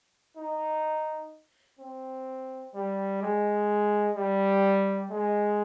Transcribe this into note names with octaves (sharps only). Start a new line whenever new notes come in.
D#4
C4
G3
G#3
G3
G#3